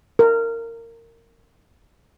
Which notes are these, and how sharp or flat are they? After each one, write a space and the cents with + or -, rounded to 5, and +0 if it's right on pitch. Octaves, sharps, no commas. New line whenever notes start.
A#4 -20